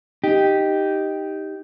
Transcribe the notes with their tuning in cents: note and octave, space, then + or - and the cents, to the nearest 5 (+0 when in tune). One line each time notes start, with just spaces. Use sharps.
D#4 +0 G4 +0